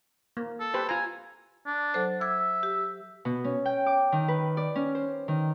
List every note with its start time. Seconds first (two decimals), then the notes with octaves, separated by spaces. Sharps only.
0.37 A#3
0.60 A4
0.74 G4 B4 C5
0.89 F4 G#5 A#5
1.66 D4
1.94 F#3 A4 C5
2.21 E5 D6 G#6
2.63 G4
3.25 B2
3.44 C#4
3.65 G5
3.86 D6
4.12 D#3
4.28 B4
4.57 D5
4.75 C#4
4.95 C5
5.28 D#3